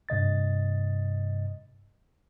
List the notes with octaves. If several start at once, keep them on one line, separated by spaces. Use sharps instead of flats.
G2 C3 D#5 A6